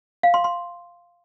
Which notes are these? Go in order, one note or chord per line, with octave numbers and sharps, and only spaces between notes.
F5
C6
C6